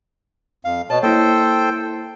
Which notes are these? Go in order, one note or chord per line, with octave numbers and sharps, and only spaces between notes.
F2 F5
B2 C#5 A5
A#3 E4 A4 C5 G5